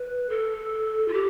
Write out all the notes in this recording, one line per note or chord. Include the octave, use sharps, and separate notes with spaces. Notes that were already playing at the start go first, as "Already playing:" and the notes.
Already playing: B4
A4
F4
G4